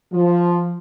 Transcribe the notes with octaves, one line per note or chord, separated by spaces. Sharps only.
F3